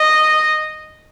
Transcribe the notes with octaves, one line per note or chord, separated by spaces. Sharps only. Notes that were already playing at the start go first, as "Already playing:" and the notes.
Already playing: D#5